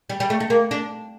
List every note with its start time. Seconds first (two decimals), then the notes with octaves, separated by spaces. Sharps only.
0.09 G3
0.20 G3
0.30 A3
0.40 A3
0.50 A#3
0.71 D4